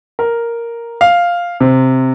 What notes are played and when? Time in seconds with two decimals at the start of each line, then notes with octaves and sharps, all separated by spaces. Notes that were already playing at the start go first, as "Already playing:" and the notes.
0.19 A#4
1.01 F5
1.60 C3